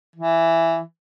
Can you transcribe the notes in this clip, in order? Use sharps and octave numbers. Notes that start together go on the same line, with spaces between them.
E3